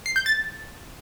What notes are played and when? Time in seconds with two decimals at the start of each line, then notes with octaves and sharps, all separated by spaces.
0.06 C7
0.16 G6
0.26 A6